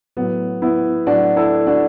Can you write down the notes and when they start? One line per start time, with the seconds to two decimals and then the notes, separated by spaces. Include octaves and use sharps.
0.17 A2 F#3 B3
0.62 B3 E4
1.07 A2 F#3 D4 F#4
1.36 E4 A4
1.67 D4 F#4